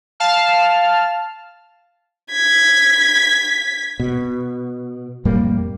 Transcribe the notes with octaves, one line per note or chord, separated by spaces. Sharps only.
F5 A5 F6
G#6 B6
B2
F2 A2 G3 A#3